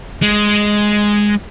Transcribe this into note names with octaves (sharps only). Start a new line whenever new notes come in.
G#3